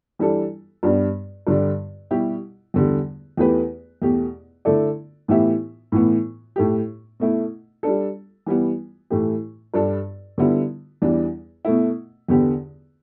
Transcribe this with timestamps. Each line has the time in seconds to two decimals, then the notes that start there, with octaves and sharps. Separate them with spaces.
0.19 E3 G3 D4 A4
0.83 G2 G3 B3 D4
1.47 G2 D3 G3 D4
2.11 B2 G3 E4 G4
2.74 E2 D3 G3
3.37 E2 E3 A3 G4 B4
4.02 E2 B2 A3 G4
4.65 D3 A3 E4 A4 D5
5.28 A2 E3 B3 G4 E5
5.92 A2 E3 B3
6.56 A2 A3 G4
7.20 B2 A3 E4
7.83 G3 D4 A4
8.46 E3 G3 B3
9.10 A2 E3 A3 G4
9.74 G2 G3 D4 A4
10.38 D3 G3 B3 E4
11.02 E2 E3 G3 D4
11.65 B2 A3 E4
12.28 E2 D3 B3 G4